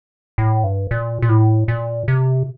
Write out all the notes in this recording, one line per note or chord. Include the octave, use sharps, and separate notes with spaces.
A2
G2
A#2
A#2
A2
A#2
C3